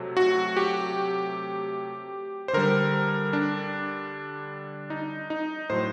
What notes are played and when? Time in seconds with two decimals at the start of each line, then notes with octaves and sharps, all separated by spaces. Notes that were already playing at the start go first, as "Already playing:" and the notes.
Already playing: C3 F#3 A3
0.17 F#4
0.57 G4
2.48 C5
2.53 D3 G3 A#4
3.33 D4
4.90 D#4
5.30 D#4
5.70 A2 F#3 A3 C5